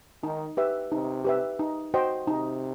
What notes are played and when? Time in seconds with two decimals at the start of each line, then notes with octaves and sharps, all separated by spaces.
0.23 D#3 D#4
0.57 G4 B4 E5
0.91 C3 D#4
1.25 G4 B4 E5
1.59 D#4
1.94 F#4 C5 D#5 G5
2.27 C3 D#4